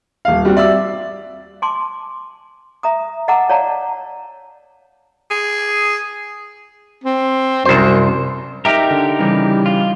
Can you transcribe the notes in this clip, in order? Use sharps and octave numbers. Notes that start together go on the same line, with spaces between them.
D#1 F5
G3 C4 F#4
D5 E5 E6
G#5 A5 C6 D6
E5 A#5 D#6
D#5 F#5 A5 A#5 D6 E6
C#5 D5 F5 A5 A#5
G#4
C4
C2 F#2 C5
D#4 G4 A#4 E5 F6
D3
C#3 E3 G3
F4